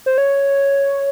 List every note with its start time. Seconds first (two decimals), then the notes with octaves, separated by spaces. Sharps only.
0.06 C5
0.18 C#5